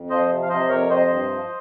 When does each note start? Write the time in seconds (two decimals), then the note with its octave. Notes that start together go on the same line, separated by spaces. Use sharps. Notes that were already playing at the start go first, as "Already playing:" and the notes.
Already playing: F2
0.10 F3 C5 D#5
0.29 C3
0.42 F5
0.49 C3 C5 D#5
0.69 F2 A#4 C#5
0.89 C3 C5 D#5
1.09 G2
1.30 F3